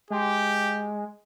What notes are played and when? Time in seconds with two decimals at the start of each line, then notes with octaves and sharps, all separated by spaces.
0.10 G#3 G4